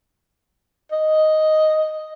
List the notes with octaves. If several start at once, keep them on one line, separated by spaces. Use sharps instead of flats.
D#5